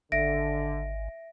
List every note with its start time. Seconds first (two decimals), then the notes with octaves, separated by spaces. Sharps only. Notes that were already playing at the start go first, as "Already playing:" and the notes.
0.12 G#1 D3 E5 A#6 D7